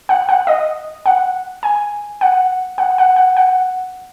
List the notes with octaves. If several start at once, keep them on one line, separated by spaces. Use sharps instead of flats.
F#5
F#5
D#5
F#5
G#5
F#5
F#5
F#5
F#5
F#5